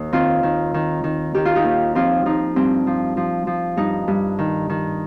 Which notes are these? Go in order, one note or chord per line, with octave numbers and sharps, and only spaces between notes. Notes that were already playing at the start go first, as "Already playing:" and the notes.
Already playing: D#2 D#4
D#3 C4 F4
D#3
D#3
D#3
D#3 G4
F4
D#4 G4
D#2
F3 C4 F4
F3 D#4
G2 C4
F3
F3
F3
G2 D#4
G2
D#3
D#3